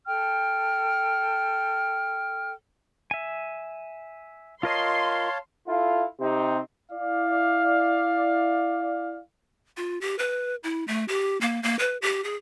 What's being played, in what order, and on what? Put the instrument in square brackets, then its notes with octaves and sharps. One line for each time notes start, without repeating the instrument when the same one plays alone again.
[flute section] A4 G5 F6
[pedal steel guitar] E5 G#5
[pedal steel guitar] F4 A#4 D#5 [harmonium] C#5 F5 A5 [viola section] C6
[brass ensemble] E4 F4 A4 F5
C3 C4 D#4 G4
E4 D5 F5
[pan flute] F4
G4
B4
E4
A3
G4
A#3
A#3
B4
G4
G#4